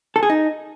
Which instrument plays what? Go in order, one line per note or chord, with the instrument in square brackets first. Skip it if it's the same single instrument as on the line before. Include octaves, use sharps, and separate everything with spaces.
[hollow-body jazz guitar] A4
G#4
D#4